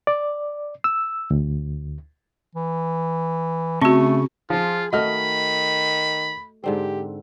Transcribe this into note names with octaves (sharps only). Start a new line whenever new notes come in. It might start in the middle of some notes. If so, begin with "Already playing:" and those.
D5
E6
D2
E3
C#3 A3 C4 F#4 C#6
F3 F4 G#4
D#3 A3 F#4 D#5 B5 F6
G#2 D3 C4 G4